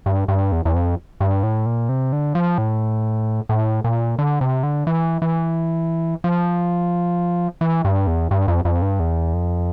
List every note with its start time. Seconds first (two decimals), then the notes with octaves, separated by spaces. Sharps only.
0.06 G2
0.28 G2
0.52 E2
0.65 E2
0.74 F2
1.20 G2
1.43 A2
1.66 A#2
1.89 C3
2.12 D3
2.35 F3
2.58 A2
3.49 A2
3.84 A#2
4.19 D3
4.41 C3
4.63 D3
4.87 E3
5.22 E3
6.24 F3
7.61 E3
7.85 G2
8.07 E2
8.31 G2
8.48 F2
8.65 F2
8.82 G2
9.00 E2
9.34 F2